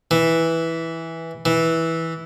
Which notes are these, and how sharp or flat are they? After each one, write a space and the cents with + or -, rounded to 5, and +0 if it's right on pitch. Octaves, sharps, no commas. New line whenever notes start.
E3 -5
E3 -10